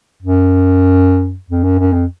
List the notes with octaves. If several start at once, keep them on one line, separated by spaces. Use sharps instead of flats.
F#2
F2
F#2
F#2
F2